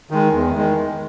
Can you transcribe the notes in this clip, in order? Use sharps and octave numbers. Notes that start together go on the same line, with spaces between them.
D#3 G#3
E2
D#3 G#3